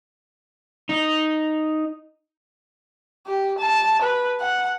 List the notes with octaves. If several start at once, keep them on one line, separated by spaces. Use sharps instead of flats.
D#4
G4
A5
B4
F#5